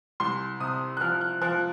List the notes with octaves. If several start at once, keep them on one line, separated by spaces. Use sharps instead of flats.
C2 C6
C3 D#6
F#6
F3 F6
F#6
F3 F#6